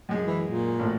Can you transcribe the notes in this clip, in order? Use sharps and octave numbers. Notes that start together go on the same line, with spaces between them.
F#2 G#3
E3
A#2
A1 A2